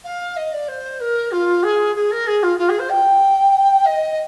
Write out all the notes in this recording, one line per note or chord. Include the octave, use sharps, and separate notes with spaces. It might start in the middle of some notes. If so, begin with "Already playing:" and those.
F5
D#5
D5
C5
A#4
F4
G#4
G#4
A#4
G#4
F4
F4
G#4
C5
G5
D#5